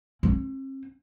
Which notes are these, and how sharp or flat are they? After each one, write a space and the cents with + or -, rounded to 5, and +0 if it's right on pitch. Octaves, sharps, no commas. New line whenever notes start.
C4 +45